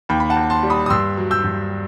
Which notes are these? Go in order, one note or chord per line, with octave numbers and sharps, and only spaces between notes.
D#2 G5 B5
B5
F#5 A5
D#2
A5 C6
G3
B5 D#6
D#6
G2 C6 E6
F#3
E6 G6
G2